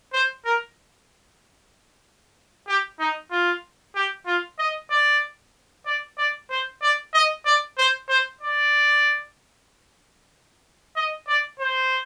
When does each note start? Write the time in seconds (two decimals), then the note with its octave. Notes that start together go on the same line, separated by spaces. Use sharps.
0.13 C5
0.45 A#4
2.68 G4
3.00 D#4
3.31 F4
3.95 G4
4.26 F4
4.59 D#5
4.90 D5
5.86 D5
6.18 D5
6.50 C5
6.82 D5
7.14 D#5
7.46 D5
7.78 C5
8.09 C5
8.41 D5
10.96 D#5
11.28 D5
11.60 C5